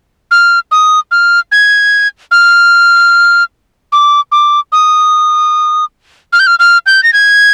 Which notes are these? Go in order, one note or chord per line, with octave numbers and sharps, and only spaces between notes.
F6
D#6
F6
G#6
F6
D6
D6
D#6
F6
G6
F6
F6
G6
A#6
G#6